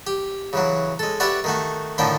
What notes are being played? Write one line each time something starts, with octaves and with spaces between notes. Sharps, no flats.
G4
C#3 E3 F#3
G#3 A4
F#4 G4 B4 D5 E5
D#3 A3 F#4
A2 D3 D#3 F3 E4 G5